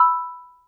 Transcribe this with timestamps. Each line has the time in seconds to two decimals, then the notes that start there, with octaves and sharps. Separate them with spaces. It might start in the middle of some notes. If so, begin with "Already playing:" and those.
Already playing: B5 E6